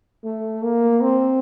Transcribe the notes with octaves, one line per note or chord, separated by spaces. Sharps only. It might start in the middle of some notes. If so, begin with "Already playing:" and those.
A3
A#3
C4